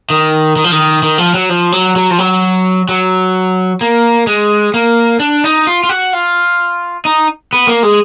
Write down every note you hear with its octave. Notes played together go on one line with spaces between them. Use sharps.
D#3
D#3
F3
D#3
D#3
F3
F#3
F3
F#3
F#3
F3
F#3
F#3
A#3
G#3
A#3
D4
D#4
F4
F4
F#4
F4
D#4
B3
A#3
G#3